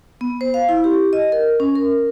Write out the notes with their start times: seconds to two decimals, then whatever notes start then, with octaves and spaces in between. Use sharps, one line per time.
0.21 B3
0.41 C5
0.54 F5
0.69 E4
0.84 G4
1.13 D#5
1.32 A#4
1.60 C#4
1.76 A#4